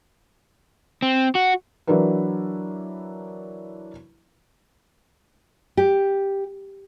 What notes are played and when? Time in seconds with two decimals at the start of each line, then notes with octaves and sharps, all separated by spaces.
1.02 C4
1.35 F#4
1.87 E3 F#3 D4 E4 A#4 B4
5.77 G4